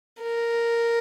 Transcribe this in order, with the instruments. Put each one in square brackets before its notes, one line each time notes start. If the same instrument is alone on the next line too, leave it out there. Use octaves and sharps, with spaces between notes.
[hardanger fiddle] A#4